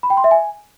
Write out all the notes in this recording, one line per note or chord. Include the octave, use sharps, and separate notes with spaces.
B5
G5
C6
E5
G#5